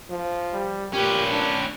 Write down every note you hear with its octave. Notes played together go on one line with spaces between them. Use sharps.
F3
G3
A#2 C#4 G4 B4
D4